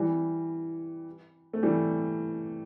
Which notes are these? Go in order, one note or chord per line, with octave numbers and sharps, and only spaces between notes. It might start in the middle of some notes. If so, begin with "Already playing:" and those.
Already playing: E3 G3
A3
E3 G3